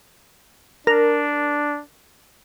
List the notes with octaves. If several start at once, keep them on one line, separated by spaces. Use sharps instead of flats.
D4 A#4